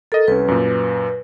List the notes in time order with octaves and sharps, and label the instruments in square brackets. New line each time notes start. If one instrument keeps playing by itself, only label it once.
[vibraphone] A4 [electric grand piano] A#4 D#5
[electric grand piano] C2 C#4 [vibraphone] B4
[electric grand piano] F#2 A#2